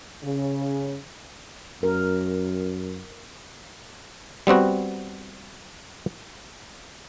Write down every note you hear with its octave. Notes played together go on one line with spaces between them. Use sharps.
C#3
F#2 A#4
G3 B3 C4 F#4